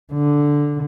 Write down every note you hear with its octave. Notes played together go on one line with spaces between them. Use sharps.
D3